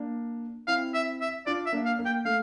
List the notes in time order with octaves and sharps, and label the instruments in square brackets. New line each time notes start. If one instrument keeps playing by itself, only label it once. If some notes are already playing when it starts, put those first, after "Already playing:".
Already playing: [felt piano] A#3 D4
[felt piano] C4 E4 [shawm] F5
[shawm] E5
E5
[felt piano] D4 F4 [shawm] D5
[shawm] E5
[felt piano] A#3 D4
[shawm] F5
[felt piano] A#3
[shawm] G5
[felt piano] A3 [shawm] F5